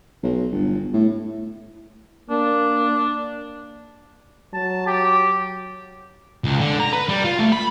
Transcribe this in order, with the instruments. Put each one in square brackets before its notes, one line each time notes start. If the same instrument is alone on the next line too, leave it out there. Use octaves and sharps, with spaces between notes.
[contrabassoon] B1
G1
A2
[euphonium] A#3 [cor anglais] D4
[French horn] F#3 [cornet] A5
[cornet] G4
[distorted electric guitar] C#2
D3
A#5
B4
G3
F4
A3
B5